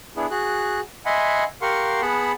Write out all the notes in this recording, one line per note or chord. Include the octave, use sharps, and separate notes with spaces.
B3 D4 E4 G#4
F#4 G#4 F#6
D#5 E5 F#5 G#5 B5 C6
G4 A#4 F5 F#5 C6 C#6
B3 G#4 F#5 A5 B5